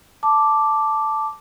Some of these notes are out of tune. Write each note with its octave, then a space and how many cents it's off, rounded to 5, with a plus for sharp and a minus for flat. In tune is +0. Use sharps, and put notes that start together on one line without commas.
A5 +0 D6 +0